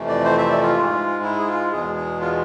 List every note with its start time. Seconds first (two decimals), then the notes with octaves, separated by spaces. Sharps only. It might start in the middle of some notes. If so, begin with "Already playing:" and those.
Already playing: F2 C3 E3 A3
0.09 D5
0.25 C5
0.38 E5
0.50 D5
0.63 F4
0.74 G#2 G#3
1.23 E4
1.39 G#4
1.47 F4
1.72 E2 B2 G#3 G#4
1.96 G#4
2.21 F4